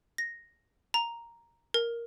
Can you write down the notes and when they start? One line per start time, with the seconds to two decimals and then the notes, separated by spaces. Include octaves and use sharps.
0.18 A#6
0.94 A#5
1.74 A#4